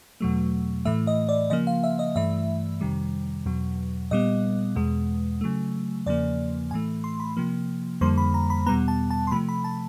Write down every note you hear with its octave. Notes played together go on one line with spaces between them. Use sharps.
E2 B2 F#3 A3
A2 E3 A3 E5
D#5
D5
C#3 F3 A#3 D#5
F5
E5
D#5
G2 E3 A3 E5
F2 C3 D#3 G3
E2 B2 F#3
A#2 G3 B3 D#5
E2 B2 G#3
C#3 F#3 A3
E2 C#3 F3 A#3 D5
A2 E3 A3 G#5
C6
B5
C3 F3 A#3
F2 D3 G3 A#3 C6
B5
A#5
B5
E2 B2 G3 B3 A#5
A5
A5
C6
C3 F3 A3 B5
B5
A5